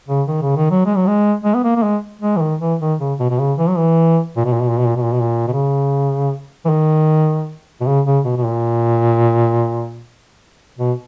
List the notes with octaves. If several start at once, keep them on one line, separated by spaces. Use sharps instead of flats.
C#3
D#3
C#3
D#3
F#3
G#3
F#3
G#3
G#3
B3
A#3
A#3
G#3
G#3
E3
D#3
E3
D#3
C#3
B2
B2
C#3
E3
F#3
E3
A#2
B2
A#2
B2
A#2
B2
A#2
B2
A#2
B2
A#2
B2
C#3
E3
D#3
B2
C#3
C#3
B2
B2
A#2
B2